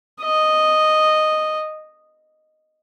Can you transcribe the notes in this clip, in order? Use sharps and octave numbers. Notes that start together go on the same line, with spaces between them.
D#5